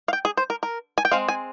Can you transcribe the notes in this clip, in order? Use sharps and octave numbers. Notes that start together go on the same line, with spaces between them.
F5
G5
G#4
C5
A#4
A#4
G#5
G5
G#3 C4 F5
G#5